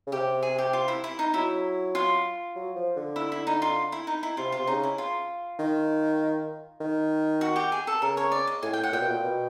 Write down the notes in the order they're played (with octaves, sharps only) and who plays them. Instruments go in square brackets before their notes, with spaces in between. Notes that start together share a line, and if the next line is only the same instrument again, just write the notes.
[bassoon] C#3
[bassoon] C3 [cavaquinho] G4
[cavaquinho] G#4
G4
F4
E4
E4
D#4
[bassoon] F#3 [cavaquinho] E4
[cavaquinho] F4
[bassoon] F#3
F3
D3
[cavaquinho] E4
E4
D#4
F4
E4
D#4
E4
[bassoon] C3 [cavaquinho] F4
[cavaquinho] F4
[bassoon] C3
[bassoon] C#3 [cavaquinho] D#4
[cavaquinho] E4
F4
[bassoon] D#3
D#3
[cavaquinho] F#4
G4
G#4
A4
[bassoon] C#3 [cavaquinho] A#4
[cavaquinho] C#5
D5
D#5
[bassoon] A2 [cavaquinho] G#5
[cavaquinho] G5
F#5
[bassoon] A#2 [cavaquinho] G5
[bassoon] B2
A#2
B2